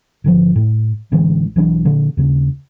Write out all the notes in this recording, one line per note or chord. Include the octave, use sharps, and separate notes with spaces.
G#1 D3 F3
A2
A1 D3 E3 G#3
B1 E3 D4
A#2 D3
D#2 C#3